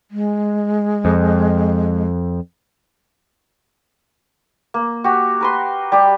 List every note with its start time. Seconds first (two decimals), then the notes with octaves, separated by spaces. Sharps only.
0.11 G#3
1.05 F2
4.74 A#3
5.04 F#4 G4
5.41 A#4 B4 C6
5.92 G3 G4